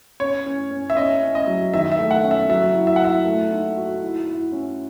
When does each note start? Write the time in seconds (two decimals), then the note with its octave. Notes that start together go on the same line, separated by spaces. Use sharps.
0.20 C#4 C#5
0.46 C#4
0.71 C#4
0.90 E5
0.97 C#4 D#5
1.23 C#4
1.35 D#5
1.47 F#3
1.73 D#3 E5
1.92 E5
1.99 A3
2.11 F#5
2.24 C#4
2.31 E5
2.49 F#3 E5
2.74 E4
2.87 E5
2.96 F#5
3.01 E4 E5
3.25 A3
3.51 D#4
3.77 F#4
4.01 E4
4.27 E4
4.52 C#4